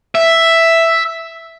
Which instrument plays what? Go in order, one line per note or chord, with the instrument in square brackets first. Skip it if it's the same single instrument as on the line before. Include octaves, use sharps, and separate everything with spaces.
[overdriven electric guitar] E5